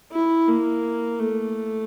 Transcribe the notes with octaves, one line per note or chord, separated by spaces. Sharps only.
E4
A#3
A3